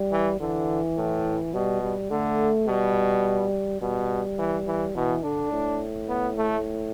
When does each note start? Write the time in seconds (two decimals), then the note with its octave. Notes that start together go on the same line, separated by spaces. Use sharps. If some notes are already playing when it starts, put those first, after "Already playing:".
Already playing: G3
0.11 E3
0.40 D3 E3
0.97 A2
1.54 B2 G3
1.83 G3
2.11 D3 A3
2.67 B2 G3
3.81 B2 G3
4.39 E3
4.67 E3
4.95 B2 E3
5.24 D3 D4
5.52 A2
6.09 B3
6.38 A3